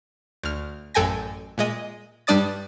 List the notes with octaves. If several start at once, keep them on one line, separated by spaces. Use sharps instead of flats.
D2 F6
A1 F#2 A4 G5 G#5 A#6
A#2 G#3 D#5 D#7
G2 G3 D4 D5 D#6 A6